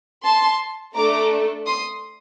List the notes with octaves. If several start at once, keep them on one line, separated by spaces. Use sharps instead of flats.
A5 C6
A3 D4 A4 A#5 D6
C6 D#6